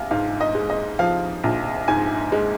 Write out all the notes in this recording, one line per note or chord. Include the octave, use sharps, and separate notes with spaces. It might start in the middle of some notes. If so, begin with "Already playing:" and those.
Already playing: A#1 F5
G#2 F5
D#5
G#3
D#5
F3 F5
A#1
G#2 G#5
G#3